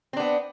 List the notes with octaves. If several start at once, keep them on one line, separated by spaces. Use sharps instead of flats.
B3 C4 D4